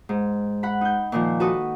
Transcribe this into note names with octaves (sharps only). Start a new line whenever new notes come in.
G#2
F#5 B5
D#4 G6
A#2 D#3 F3
F#4 A4 B4 C#6 D#6